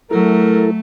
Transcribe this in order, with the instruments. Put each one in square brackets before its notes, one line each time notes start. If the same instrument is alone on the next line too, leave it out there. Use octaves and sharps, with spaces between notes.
[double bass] F#3 [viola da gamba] A3 [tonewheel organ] E4 A4 [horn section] A#4